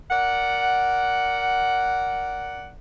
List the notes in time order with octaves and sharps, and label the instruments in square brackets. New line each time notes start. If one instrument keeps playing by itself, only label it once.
[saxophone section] A#4 D5 F#5